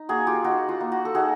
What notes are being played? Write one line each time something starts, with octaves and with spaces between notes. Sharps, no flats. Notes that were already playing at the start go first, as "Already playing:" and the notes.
Already playing: D#4
A#3 F#4 G#4
F4 G4
D#4 F#4
F4
A#3
F#4
A4
D#4 F#4 G#4